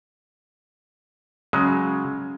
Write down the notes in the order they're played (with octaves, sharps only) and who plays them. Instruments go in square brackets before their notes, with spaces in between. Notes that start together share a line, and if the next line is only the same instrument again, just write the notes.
[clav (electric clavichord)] C#3 F#3 G#3 [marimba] C#4